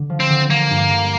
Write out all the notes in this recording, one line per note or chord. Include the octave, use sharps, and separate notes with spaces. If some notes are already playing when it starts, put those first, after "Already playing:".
Already playing: D3
F3
C4
D3
F3 A#3
G2
D3